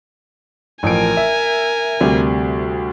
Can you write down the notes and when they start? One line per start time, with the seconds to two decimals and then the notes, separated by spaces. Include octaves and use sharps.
0.83 A1 F3 A#4 G#5 D7
1.17 E5
2.01 D2 C3 G3